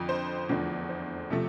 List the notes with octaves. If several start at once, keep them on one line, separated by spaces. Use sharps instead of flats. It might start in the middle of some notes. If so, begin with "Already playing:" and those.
Already playing: F2 D3 F3
C5
E2 D3 F3 A3
C5
C3 F3 A3